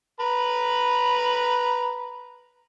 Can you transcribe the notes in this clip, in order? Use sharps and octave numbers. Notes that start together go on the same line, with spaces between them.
B4 A#5 B5